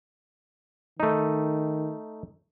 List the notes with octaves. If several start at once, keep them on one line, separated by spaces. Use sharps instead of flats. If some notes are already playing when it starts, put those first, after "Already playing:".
D#3 A3 D#4